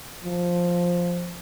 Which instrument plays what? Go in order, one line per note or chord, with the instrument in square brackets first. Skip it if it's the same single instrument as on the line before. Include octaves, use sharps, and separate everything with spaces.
[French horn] F3